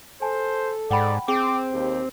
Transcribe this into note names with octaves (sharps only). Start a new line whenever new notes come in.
A4 C5 G#5 A5
G#2 D5 F#5 G5 B5
C4 G#4 G5 D6
D#2 G4